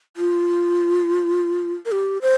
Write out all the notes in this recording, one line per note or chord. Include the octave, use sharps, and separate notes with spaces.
F4
A#4
G4
C5